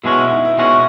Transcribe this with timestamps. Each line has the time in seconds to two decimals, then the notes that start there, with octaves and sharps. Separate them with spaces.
0.03 B2 G#3 C#4 E4 F#4
0.17 E4
0.31 D#4
0.45 E4
0.58 B2 G#3 C#4 F#4